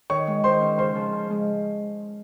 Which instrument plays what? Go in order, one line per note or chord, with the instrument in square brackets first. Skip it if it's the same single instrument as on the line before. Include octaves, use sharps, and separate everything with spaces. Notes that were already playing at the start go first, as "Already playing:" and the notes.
[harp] D#3 [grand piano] C#5 C#6
[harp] G#3
[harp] D#3 [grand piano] C5 C6
[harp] C#4
[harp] C#3 [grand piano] C5 C6
[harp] F3
C#3
G#3